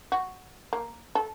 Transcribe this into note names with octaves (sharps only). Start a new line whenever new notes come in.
F#4
A#3
A4